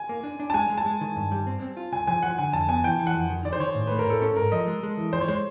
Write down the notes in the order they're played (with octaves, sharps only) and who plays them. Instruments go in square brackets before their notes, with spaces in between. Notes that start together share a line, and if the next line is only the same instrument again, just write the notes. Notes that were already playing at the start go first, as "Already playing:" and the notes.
Already playing: [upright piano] G#5
[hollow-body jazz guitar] A#3
D4
D4
[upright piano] A5
[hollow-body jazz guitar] G#3 [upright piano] G#5
[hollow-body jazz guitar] G#3
[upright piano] A5
[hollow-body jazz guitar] G#3
D#3
G2
G3
C4
C4
F4
[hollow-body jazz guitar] C2 [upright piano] G#5
[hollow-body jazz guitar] F3 [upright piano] G#5
[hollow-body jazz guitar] F3 [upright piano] F#5
[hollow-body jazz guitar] D3 [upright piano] G#5
[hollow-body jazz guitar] F2 [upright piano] A5
[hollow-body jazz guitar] B3 [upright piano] G#5
[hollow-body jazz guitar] E3 [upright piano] G5
[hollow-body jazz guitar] E3
[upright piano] F#5
[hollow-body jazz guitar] F2
D#3
[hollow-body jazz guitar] D#3 [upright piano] D5
[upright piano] C5
[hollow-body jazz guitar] D#3 [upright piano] C#5
[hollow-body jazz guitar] A2
[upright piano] B4
[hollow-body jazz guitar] A3
[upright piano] A#4
[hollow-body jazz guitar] A2 [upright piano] A4
[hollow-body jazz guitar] C#4 [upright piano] A4
[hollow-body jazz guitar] G#2 [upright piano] A#4
[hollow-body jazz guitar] F3 [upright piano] D#5
[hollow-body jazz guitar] G#3
G#3
E3
[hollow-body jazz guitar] F3 [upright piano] C5
[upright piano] C#5
[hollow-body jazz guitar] G#3 [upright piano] C5